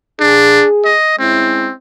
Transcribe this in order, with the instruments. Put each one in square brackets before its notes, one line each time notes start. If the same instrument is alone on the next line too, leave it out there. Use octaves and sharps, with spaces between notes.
[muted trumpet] D4 [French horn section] G#4
[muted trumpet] D#5
[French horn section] G#3 C#4 E4 [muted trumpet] C4